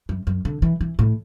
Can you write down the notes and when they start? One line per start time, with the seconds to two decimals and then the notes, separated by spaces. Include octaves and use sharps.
0.09 F#2
0.27 F#2
0.45 D3
0.62 E3
0.81 E3
0.99 A2